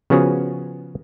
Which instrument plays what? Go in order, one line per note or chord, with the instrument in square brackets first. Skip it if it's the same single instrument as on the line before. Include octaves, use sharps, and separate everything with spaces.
[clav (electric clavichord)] C#3 F3 B3 C#4 F#4 G#4